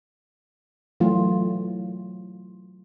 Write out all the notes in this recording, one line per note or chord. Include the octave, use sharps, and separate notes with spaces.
E3 F#3 A3 F4